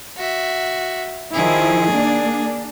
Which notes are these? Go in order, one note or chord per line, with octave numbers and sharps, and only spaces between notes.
F#4 E5
D#3 F3 E4 G#4
A#3 D4